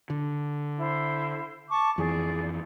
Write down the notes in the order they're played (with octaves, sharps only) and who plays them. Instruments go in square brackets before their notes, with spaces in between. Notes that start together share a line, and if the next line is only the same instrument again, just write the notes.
[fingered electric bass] D3
[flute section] E4 C5
A5 C#6 D6
[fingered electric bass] F2 E3 [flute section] G#4 D5